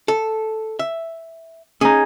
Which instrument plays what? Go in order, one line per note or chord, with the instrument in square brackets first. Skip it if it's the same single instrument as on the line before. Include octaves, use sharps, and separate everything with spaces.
[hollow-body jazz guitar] A4
E5
[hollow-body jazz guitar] C#4 [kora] D#4 G#4